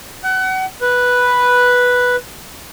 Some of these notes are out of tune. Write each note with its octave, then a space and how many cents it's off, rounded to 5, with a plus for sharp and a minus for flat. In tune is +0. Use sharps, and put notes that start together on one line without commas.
F#5 +30
B4 -5